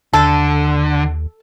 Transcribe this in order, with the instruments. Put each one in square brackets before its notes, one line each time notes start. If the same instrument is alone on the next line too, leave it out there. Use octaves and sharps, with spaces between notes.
[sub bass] D#2 [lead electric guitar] D3 [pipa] A4